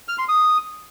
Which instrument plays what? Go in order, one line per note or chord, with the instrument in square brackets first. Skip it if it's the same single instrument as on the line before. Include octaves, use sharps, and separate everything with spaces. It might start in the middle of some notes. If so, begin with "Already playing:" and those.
[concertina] F6
C6
D#6